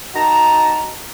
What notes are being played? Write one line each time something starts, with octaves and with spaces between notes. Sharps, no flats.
D#4 F#4 A5 A#5